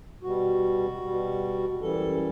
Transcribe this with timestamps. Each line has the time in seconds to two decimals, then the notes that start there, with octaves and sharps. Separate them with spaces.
0.23 B2 G3 F#4
1.02 B2 G3
1.81 F#2 E3 G3 A4